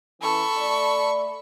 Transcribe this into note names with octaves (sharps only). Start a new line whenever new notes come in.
E3 C#4 A4 B5 C#6
A3 D5